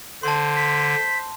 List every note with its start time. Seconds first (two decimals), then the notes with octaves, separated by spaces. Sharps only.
0.23 D3 C5 A5 C6
0.56 B6